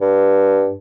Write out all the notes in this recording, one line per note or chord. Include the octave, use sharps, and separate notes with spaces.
G2